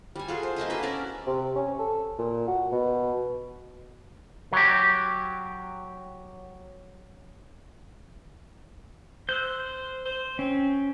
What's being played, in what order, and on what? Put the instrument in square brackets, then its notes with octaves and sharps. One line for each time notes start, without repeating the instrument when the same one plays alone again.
[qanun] G3 G#5
F4 F#4 G#4 A4
C5
A#3 D#5 E5 G#5
F#4 A4 B4 E5
C#4 A#4 D5
[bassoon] C3
C#4
A4
A#2
F#4
B2
[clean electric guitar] F#3 G4
[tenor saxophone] C5 [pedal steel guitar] E6 F#6 G6
[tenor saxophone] C5
[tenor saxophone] C4 [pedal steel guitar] C#4